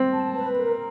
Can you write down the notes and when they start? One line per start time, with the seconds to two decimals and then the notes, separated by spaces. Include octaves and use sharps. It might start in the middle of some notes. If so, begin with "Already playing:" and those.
Already playing: C4
0.12 A5
0.35 B4
0.57 A#4